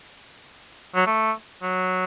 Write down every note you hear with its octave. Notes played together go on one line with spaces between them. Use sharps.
F#3
A3
F#3